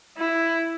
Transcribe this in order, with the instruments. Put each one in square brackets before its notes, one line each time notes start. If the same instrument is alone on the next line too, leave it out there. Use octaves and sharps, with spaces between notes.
[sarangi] E4